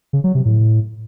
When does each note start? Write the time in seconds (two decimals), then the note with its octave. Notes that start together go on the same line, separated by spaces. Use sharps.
0.13 C#3
0.24 F#3
0.35 C3
0.45 A2